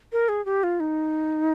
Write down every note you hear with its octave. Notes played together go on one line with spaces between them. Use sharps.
A#4
G#4
G4
F4
D#4